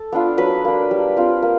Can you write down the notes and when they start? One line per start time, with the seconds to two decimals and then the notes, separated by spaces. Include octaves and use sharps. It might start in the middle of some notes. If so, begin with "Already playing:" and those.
Already playing: A4
0.12 B3 D4 F4
0.37 F#3 B4
0.65 A#3 D4
0.91 G3
1.17 C4 F4
1.42 A#3